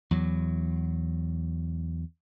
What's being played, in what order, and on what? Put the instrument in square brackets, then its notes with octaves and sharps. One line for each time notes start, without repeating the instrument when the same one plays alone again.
[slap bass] E2 F#3